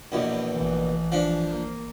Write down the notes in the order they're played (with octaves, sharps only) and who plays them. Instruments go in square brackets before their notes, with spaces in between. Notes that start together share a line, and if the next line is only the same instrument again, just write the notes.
[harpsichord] A#1 E2 B2
[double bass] A1 E3
[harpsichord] F3 D4
[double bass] A#3